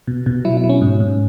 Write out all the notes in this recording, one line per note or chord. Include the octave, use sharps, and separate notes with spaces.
B2
B2
F#3 E4
E4
F#3
C#4
G#2
G#2